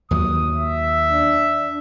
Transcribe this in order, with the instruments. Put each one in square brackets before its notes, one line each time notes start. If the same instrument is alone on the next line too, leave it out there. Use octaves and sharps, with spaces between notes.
[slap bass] D#2 F#3 [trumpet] D#6
[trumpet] E5
[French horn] D4